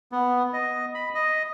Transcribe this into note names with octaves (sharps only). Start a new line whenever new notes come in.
B3
D#5
B5
D#5